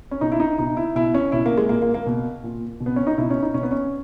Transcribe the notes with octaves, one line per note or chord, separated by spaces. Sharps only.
C#4
B2 D#4
E4
D#4
B2 D#4
E4
B2 E4
C#4
B2 E4
A#3
G#3
A#2 A#3
A#3
A#3
B2
A#2
B2
B3
C#4
D#4
B2 E4
C#4
D#4
B2 C#4
B3
C#4